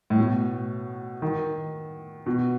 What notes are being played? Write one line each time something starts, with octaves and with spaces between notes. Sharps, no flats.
A2
B2
D#3
B2